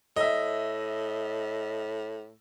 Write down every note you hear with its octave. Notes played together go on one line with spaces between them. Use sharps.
A2 D#5 E5